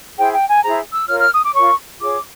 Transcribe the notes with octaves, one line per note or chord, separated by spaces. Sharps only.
E4 G#4 C5 G5
G5
G#5
E4 G#4 C5 A#5
E6
F4 A#4 C#5 F6
F6
D#6
D6
F4 A#4 C#5 C#6
F4 G#4 C#5 D6